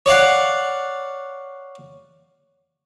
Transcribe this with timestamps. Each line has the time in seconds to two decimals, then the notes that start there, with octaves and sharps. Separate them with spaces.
0.06 C#5 D5 F5 F#5